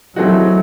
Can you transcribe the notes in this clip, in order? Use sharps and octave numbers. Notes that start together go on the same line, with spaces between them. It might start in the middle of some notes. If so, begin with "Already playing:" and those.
E3 F#3 A3 C4 D#4 F#4